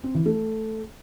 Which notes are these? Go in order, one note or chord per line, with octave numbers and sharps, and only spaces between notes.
C4
E3
A3